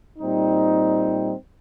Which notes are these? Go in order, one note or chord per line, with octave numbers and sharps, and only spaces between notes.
A#2 G3 C4 D#4